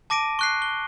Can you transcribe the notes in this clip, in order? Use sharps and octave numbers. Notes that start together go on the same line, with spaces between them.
A5 D6 A#6 D7 D#7
C#6 F#6 C7
G7